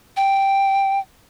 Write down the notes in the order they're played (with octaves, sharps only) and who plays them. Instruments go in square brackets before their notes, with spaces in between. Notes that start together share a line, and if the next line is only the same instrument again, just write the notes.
[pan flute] G5